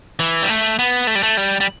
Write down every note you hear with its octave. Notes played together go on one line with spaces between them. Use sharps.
E3
G3
A3
B3
A3
G3
A3
G3
G3